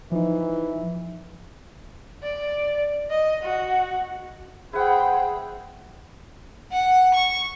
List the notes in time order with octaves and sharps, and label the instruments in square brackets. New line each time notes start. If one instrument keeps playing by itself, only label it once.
[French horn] E3 [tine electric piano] F3 D#4
[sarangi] D5
D#5
F#4
[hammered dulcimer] E4 B4 F#5 [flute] G#4 [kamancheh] C5 G5
[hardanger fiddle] F#5
C#6